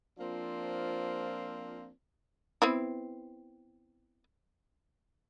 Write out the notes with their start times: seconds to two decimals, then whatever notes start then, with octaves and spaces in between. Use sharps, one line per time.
0.20 F3 A#3 C4 D4 F4
2.62 B3 C4 E4